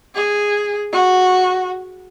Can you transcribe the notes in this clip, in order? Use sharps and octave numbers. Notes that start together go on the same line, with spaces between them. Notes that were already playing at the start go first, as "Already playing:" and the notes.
G#4
F#4